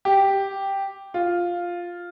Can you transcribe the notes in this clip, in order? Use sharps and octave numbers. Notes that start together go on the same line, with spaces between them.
G4
F4